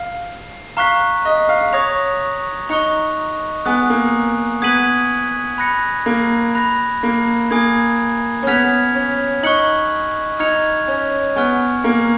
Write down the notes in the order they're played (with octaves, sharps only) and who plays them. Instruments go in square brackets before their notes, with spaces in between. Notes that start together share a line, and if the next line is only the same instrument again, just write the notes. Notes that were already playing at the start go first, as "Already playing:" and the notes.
Already playing: [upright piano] F5
[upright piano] F5 [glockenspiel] A#5 C#6 F#6 B6
[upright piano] D#5
F5
[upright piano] C#5 [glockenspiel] D#6 A#6 F7
[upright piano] D#4 [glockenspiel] C#6 F#6 C#7 F7
[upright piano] B3 [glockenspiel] G#5 D#6 F#6
[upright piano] A#3
[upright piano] B3 [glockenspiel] D#6 G#6 B6 D#7 F#7
[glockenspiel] B5 F#6 A#6 C#7
[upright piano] A#3
[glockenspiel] B5 F#6 A#6
[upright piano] A#3
[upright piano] A#3 [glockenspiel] G#5 D#6 G#6
[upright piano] C#4
[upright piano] B3 [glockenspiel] F6 G#6 B6 F7
[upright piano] C#4
[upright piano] D#4 [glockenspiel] C#6 F#6 C#7 F#7
[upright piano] D#4 [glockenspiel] F6 G#6 C#7 F7
[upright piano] C#4
[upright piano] B3 [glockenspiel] G#5 C#6 F6
[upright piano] A#3